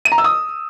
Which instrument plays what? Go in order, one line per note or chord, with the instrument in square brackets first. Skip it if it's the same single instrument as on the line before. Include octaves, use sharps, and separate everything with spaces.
[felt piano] D#7
A#5
E6
D#6